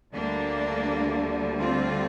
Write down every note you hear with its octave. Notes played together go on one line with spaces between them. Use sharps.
D2 D3 G3 A#3 D4
C4 F4